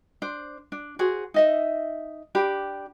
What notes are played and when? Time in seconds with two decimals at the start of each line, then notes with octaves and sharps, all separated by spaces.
0.22 D4 C5
0.72 D4
0.99 F#4 G#4 C5
1.34 D#4 D#5 E5
2.35 D4 G4 B5